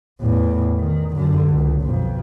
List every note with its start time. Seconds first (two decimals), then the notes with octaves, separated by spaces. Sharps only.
0.20 E2 A2
0.79 D#3
1.16 F#2 D3
1.48 C#2
1.81 B1 F2